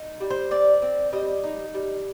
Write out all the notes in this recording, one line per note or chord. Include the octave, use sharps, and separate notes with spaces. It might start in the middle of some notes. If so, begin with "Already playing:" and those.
Already playing: D#4
G3
C5
C4 D5
C4
G3 D#5
D#4
G3